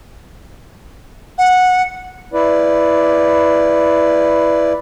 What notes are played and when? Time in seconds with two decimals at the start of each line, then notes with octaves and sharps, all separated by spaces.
1.38 F#5
2.33 E4 B4 D5